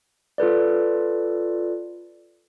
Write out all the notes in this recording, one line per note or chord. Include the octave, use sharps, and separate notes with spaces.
F4 A4 B4 D5